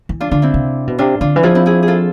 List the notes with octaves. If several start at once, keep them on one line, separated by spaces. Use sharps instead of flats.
E3
D4 F4
D3 D4 F4
C4 E4
C3
B2
C3 D4 F4
D3 D4 F4
E3
F3 E4 G#4
C4 E4
E4 G#4
G#4
F4 A4